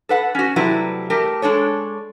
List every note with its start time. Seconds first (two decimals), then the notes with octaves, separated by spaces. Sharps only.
0.09 A4 B4 F#5
0.35 C#4 F#4
0.56 C3 F#3 G3 A3 E4 B4
1.10 A3 G4 A#4
1.42 G#3 D4 A4 C#5